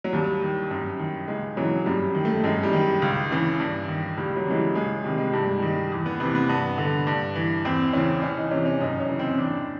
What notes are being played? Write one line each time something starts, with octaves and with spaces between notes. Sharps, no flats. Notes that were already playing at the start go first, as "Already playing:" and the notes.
F#3
D#2 G3
D#3
F#2
D#3
C#2 G#3
C#3 E3 F#3
F#2 G3
D#3
A3
F#2 G#3
G3
D#3
C#2
C#3 E3
G2
D#3
C#2 G3
F#3
C#3 E3 G#3
G3
C#2 G#3
C3 D#3 G3
G#3
G2 G3
G#3
D#3 G3
E2
B3
C3 E3 B3
B3
G2 B3
D3
G2
E3
E2 C4
C#3 E3 C#4
C2 C#4
D#4
C3 E3 C#4
C#4
F#2 D#4
C#4
C#3 E3
C4
E2 D4